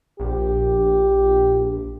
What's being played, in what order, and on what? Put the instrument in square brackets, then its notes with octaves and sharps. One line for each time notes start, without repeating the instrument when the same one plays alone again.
[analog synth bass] A#1 [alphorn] G4